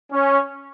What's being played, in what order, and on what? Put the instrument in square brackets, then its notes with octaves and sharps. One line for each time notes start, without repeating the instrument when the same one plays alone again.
[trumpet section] C#4